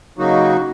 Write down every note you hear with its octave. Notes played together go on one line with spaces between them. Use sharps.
C#3 F#3 A#3 D#4 F#4